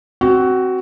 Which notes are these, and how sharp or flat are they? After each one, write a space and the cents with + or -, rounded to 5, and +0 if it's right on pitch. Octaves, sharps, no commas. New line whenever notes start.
C4 +0 F#4 +15